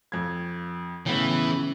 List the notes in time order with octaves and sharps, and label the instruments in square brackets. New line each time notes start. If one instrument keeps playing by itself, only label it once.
[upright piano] F2 G#6
[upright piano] A2 B3 [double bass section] C#3 [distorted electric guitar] E3